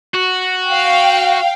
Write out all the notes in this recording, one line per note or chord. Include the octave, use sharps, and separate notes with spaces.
F#4
F5 G5